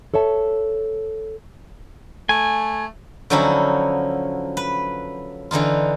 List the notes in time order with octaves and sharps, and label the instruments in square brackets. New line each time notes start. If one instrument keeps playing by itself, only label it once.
[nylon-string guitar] A4 C#5 E5 A5
[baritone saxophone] A3 [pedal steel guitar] G#5
[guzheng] D3 F3 F#3 C#4 D#4 E4
B4
D3 E3 D#4 F4